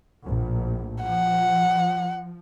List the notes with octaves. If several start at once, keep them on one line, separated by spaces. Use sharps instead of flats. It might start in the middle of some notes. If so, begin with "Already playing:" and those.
A#1 A2
F3 F#5